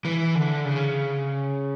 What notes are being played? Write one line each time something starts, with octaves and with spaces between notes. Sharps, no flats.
E3
D3
C#3